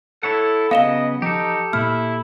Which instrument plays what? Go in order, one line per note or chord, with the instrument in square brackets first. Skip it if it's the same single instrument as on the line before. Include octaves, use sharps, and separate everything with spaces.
[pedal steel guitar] E4 C#5 F#5 [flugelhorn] A4
[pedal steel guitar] C#3 F#3 B3 [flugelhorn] D#5 [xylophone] F5 E7 G7
[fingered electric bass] F3 [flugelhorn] D#4 [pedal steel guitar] G4 A4
[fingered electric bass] A#2 A#3 [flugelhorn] E4 [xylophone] F6